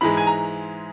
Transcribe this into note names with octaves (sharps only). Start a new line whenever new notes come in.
G#2 E3 G#3 B5
G#5
A#5